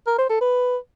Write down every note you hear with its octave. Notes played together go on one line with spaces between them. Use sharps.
A#4
C5
A4
B4